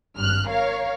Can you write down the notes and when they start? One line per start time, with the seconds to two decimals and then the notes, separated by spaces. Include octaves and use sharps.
0.16 G#1 G2 F6 F#6
0.49 A#4 C#5 F5